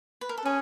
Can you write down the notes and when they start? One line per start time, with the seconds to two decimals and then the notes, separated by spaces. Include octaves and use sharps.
0.21 B4
0.29 A#4
0.38 A4
0.45 C#4 G#4